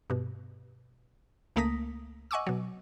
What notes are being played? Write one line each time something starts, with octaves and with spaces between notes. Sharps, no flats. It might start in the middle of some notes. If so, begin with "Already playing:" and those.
G2 B2
C#2 A3 A#3 D#6 A#6 B6
D#5 F#5 G#5 C#6 D6 E6
B2 F#3